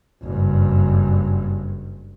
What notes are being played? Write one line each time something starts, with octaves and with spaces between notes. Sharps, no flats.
F#1 G2